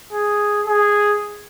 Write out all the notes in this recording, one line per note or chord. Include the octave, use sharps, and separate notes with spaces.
G#4
G#4